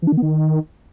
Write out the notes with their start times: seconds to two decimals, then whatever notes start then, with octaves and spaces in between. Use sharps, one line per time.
0.02 E3
0.07 D4
0.12 D#3
0.17 B3
0.22 D#3